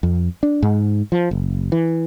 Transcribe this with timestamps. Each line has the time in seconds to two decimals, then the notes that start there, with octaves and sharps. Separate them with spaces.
0.03 F2
0.43 D4
0.62 G#2
1.12 F3
1.31 F#1
1.72 E3